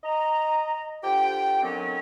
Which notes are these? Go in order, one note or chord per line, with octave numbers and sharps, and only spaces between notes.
D#5 A#5
D3 F3 G4 G5
D3 D#3 F#3 C4 C#4